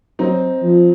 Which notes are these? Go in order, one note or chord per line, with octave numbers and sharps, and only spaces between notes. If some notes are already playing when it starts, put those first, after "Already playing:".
F#3 C4 D#4
F3